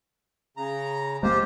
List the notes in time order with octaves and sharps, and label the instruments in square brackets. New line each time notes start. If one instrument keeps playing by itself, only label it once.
[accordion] C#3 A#5
[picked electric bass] G#3 A#3 [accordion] F4 G4 C5